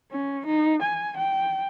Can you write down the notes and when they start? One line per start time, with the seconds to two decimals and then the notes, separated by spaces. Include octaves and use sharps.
0.11 C#4
0.46 D#4
0.82 G#5
1.17 G5